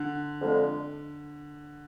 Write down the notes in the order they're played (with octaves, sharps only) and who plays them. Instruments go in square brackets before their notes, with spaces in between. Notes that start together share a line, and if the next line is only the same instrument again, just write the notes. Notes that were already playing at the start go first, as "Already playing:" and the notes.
Already playing: [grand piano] D3
[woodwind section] F2 D3 G#3